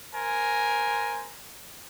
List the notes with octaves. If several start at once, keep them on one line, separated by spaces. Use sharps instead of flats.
A#4 C5 G#5